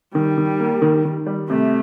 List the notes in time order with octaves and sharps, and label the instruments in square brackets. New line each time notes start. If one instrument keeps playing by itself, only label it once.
[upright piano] D#3 [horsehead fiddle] G3
[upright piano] D#3
A#3
D#3
D#3
G3
[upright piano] C3 [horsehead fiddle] A3